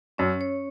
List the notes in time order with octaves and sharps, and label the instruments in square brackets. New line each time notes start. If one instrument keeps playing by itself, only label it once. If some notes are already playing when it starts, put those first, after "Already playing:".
[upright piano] F#2 [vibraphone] C#4
[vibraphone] C#5